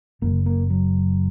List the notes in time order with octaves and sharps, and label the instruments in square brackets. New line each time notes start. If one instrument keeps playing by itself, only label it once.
[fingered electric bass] F#1 F#2 C#3 A#3
A#3
F#3